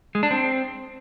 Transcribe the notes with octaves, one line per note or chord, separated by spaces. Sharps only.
G#3
D4
C4